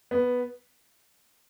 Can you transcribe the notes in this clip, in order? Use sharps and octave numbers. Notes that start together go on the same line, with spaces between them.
B3